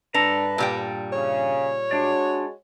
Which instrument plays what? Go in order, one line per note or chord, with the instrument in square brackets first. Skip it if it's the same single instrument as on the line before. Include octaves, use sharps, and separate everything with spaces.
[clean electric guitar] G2 A4 A#5 [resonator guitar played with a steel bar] D4 [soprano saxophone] B4
[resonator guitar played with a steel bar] A#2 G3 G5
[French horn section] C#3 [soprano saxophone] C#5
[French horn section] G#3 F#4 [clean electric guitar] D4 D5